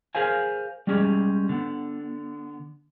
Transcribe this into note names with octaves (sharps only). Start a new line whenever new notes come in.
G#4 A#4 C5 F5 G#5
G3 G#3 C#4 G4 G#4
D3 B3